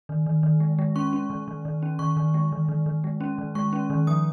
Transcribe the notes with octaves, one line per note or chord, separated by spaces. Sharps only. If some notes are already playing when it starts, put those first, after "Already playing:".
D#3
D#3
D#3
G#3
G#3
C#4 C#6
C#4
D#3
D#3
D#3
C#4
D#3 C#6
D#3
G#3
D#3
D#3
D#3
G#3
C#4
D#3
G#3 C#6
C#4
D#3
F3 D#6